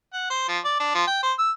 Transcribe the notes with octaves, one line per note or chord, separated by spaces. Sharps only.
F#5
C5
F3
D5
D4
F3
G5
C5
E6